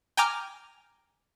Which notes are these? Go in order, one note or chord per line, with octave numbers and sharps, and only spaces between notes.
G5 G#5 A#5 D6 F6